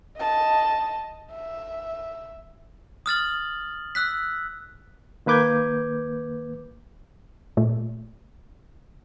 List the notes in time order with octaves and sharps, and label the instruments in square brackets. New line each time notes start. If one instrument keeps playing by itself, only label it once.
[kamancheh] D#5 A5
E5
[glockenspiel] D#6 F6 A6 F#7
E6 F#6 B6
[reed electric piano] D#3 A#3 B4 D6 G6 G#6
[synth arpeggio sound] A#2 A3